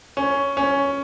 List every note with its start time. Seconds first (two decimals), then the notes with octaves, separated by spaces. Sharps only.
0.17 C#4
0.57 C#4